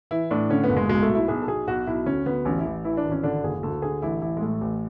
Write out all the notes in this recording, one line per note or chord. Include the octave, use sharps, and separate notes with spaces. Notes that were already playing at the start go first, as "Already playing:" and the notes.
E3 E4
A2 D4
D3 C#4
B3
F#1
G#3
B1 G#3
A3
B2
E4
B1 G#4
A4
B1 G#4
B1 F#4
B1 E4
D2 C#4
D2 B3
A1 C#4
E4
A1
E3 E4
D4
G#1
C#4
D3 D4
F#1 G#4
D2 A4
D3 G#4
A1 E4
A1 E4
G#3
A2 A3
A1